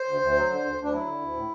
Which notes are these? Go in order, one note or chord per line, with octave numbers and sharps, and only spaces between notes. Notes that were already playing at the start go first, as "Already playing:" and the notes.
Already playing: C5
D2
D2
F#3
D3
D2
D2 D4
F#3 E4
D3
D2
A2